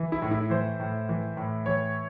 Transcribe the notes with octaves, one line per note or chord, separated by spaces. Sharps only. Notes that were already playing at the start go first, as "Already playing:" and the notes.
Already playing: E3
E4
A2
E4
E3 C5
A2
E3
A2
E3 C#5